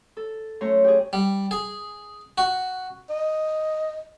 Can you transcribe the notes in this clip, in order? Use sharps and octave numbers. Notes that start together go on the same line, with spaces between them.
A4
F#2 A3 C#5 A#5 C6 C#6
G4 G#4
G3
G#4
F#4
D#5